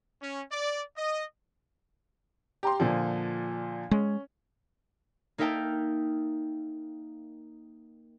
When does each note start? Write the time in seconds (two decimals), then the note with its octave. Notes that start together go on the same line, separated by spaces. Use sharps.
0.21 C#4
0.51 D5
0.96 D#5
2.63 G4 A#5 C6
2.80 A#2 D3 F3
3.91 G#3 C#4
5.38 A#3 D#4 A#4 E5 G5 A5